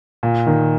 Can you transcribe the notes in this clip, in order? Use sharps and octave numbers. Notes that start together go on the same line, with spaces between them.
A#2
D#3